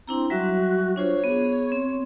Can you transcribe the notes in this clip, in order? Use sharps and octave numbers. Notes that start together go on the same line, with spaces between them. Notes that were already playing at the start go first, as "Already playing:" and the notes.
C4 D4 E4 A#5
F#3 G3 F#4 E5
D4 F4 C5 C#5
B3 G#4
C4